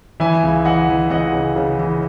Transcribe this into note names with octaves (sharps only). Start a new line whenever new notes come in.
E3 E5 G#5
C#2
E3 D#5 F#5
E3
C#2 D#5 F#5
C#3
C#3
E3